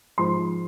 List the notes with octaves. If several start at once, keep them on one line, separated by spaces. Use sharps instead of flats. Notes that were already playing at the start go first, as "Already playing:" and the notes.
G#2 F3 G#3 C6